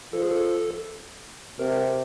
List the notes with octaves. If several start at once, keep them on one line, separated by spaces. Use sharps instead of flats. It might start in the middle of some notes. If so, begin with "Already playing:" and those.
F3 A4
G#4
A4
C3 A#4